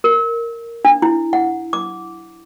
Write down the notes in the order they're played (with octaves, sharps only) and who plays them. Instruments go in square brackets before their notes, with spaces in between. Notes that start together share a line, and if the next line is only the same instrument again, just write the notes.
[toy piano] A#4
D4
E4
F#5
D6